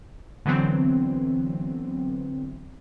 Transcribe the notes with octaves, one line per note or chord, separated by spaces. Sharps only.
D3 E3 F#3 B3 C4